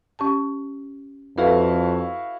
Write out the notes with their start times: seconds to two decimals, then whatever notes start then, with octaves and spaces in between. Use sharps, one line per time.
0.19 C#4 G4 A5
1.38 F2 E4 F#4 A4 B4 F5